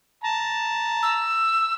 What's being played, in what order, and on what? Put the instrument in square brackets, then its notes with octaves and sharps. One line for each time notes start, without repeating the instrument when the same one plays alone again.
[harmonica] A5 A#5
[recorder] E6